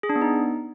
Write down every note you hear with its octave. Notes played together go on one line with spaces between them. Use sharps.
G#4
D4
B3
D#4